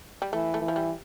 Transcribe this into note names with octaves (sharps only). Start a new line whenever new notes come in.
G3
E3 A3
A3
E3
F3
G3